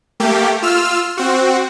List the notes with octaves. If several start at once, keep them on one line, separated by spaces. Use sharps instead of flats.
A3 A#3 G4
F4 E6 F6
C4 F#4